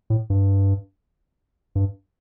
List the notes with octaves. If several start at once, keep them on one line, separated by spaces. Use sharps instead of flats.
A2
G2
G2